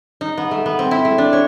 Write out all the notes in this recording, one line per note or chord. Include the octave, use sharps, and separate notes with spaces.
D#4
B3
A3
B3
C4
E4
A3
D4
C#5